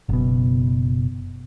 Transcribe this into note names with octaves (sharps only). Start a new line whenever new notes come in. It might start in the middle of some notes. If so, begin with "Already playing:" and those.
F#1 B2